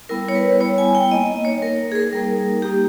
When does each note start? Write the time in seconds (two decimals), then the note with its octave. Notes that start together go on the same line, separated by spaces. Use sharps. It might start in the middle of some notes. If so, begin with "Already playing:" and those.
0.09 G3 B3 E4 A#4
0.29 C#5
0.35 B4
0.60 G3 B3 E4 C#5
0.78 G#5
0.95 G5
1.11 A#3 D#4 D#5
1.45 C#5
1.62 A#3 A#4
1.65 D#4
1.92 G#4
1.95 A#4
2.12 G3 A#3 D#4 A#4
2.62 G3 A#3 D#4 G4